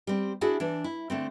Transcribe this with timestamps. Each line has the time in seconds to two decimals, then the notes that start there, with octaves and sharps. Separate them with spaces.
0.07 G3 C4
0.41 D4 E4 F#4 G#4 A4
0.60 E3 D4
0.84 E4
1.10 D3 A3 C4